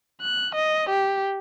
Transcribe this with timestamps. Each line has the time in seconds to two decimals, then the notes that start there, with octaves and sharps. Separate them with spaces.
0.21 F#6
0.55 D#5
0.90 G4